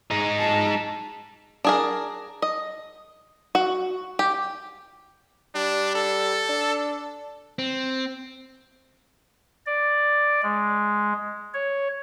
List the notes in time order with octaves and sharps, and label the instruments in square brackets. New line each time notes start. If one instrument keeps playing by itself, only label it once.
[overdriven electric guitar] G#3 D#4
[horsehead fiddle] A5
[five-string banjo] D4 G#4 A#4
D#5
F#4
G4
[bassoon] G3 [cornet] D4
[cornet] A4
[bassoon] D4
[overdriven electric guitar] C4
[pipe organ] D5
G#3
C#5